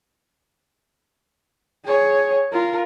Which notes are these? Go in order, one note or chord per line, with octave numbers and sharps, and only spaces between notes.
G#4 C#5
F4 A#4